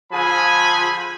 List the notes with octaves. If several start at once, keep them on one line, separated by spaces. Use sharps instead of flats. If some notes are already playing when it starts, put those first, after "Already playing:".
D3 F3 F4 G#4 G#5 B5